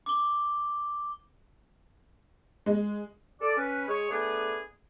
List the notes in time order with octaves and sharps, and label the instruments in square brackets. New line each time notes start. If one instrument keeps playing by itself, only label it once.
[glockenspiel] D6 G7
[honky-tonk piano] G#3
[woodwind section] A4 D5
C#4 B4
G#3 G#4 C#5
A3 B3 D4 G#4